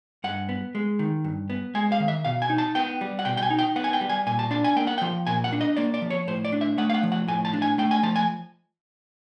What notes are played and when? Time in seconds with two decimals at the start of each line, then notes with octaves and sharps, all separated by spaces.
0.24 G2 F#5
0.49 B3
0.75 G#3
0.99 D#3
1.24 G2
1.50 B3
1.75 G#3 G#5
1.92 F5
2.00 D#3
2.08 E5
2.25 B2 F5
2.42 G#5
2.50 D#4
2.58 A5
2.75 B3 G5
3.01 G3
3.19 F#5
3.25 B2 G5
3.37 G5
3.43 G#5
3.51 D#4
3.59 G5
3.76 B3 F#5
3.84 G#5
3.93 G5
4.01 G3
4.09 G#5
4.27 A#2 G#5
4.39 A5
4.51 D4 A5
4.64 G#5
4.76 A#3 G5
4.87 F#5
4.98 F3 G5
5.27 A#2 G#5
5.44 F#5
5.53 D4
5.61 D#5
5.77 A#3 D5
5.94 D5
6.02 F3
6.10 C#5
6.27 A2 C5
6.45 D5
6.52 D4
6.61 E5
6.78 A3 F#5
6.90 F5
6.94 F#5
7.03 F3
7.12 F#5
7.28 A2 G#5
7.45 A5
7.53 D4
7.62 G#5
7.78 A3 G5
7.91 G#5
8.03 F3 A5
8.16 G#5